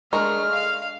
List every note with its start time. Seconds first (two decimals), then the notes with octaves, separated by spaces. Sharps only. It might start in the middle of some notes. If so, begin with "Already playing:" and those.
0.13 G#3 A3 D4 A#4 A#5 C#6 F6
0.52 F5